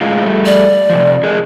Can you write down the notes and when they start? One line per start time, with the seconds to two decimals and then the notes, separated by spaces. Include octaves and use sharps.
0.01 A2 G#3 F4
0.23 G3 A3
0.46 D5
0.90 C3 F3
1.23 G#4 A#4 D#5